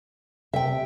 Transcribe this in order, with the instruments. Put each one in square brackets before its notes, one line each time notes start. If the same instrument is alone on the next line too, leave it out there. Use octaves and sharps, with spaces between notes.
[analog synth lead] C3 [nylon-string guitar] E5 G5